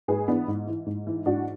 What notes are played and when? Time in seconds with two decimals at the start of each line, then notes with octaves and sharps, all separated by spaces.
0.08 G#2 G#4 B4
0.28 E3 B3 D4
0.48 G#2
0.67 E3
0.86 G#2
1.07 E3
1.26 G#2 D4 F#4